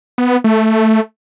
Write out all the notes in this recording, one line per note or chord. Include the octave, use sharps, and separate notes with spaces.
B3
A3